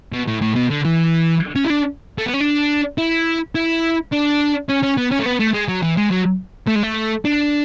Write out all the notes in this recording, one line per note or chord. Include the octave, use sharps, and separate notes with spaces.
B2
A2
A2
B2
D3
E3
C#4
E4
D4
A3
B3
C#4
D4
E4
E4
D4
C#4
C#4
B3
C#4
A3
B3
A3
G#3
F#3
E3
G#3
F#3
A3
G#3
A3
D4